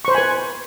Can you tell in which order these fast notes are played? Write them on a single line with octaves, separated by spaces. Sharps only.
C#6 C5 B5 G#5 B4